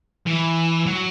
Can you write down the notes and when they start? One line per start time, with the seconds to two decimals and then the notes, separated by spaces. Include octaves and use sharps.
0.26 E3
0.87 F#3